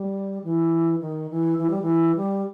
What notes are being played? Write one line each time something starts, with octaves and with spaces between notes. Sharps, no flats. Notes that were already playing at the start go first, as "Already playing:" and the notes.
Already playing: G3
E3
D#3
E3
E3
G3
E3
G3